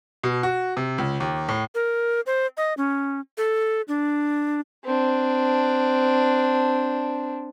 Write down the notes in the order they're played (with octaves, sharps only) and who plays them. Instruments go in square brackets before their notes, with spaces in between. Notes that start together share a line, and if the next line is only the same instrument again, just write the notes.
[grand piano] B2
F#4
C3
C#2
D#2
A2
[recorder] A#4
C5
D#5
C#4
A4
D4
[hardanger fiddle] C4 D4